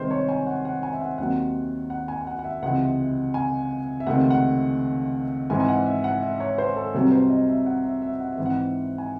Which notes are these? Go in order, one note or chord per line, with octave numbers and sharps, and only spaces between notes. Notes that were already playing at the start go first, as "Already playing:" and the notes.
Already playing: C2 C3 D#3 G#3 C4 C5
C#5
G#5
F#5
F#5
G#5
E5
F#5
D#2 D#3 F#3 C4 F#5
F#5
G#5
G#5
F#5
F#5
E5
C#2 C3 E3 G#3 C4 F#5
G#5
E5
C#2 C3 D#3 A3 C4 F#5
F#5
G#2 E3 G#3 C4 G#5
G#5
F#5
E5
F#5
E5
C#5
C5
A4
C2 C3 F#3 C4 A4
C5
D#5
E5
F#5
E5
E5
F#5
E5
G#2 E3 C4
F#5
G#5